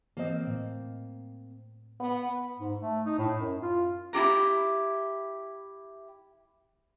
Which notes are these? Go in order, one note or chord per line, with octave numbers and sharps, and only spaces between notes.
E3 A#3 C4 D#5
A2
B3
G#2
A3
D#4
A2
F#2
F4
E4 F4 G4 A#5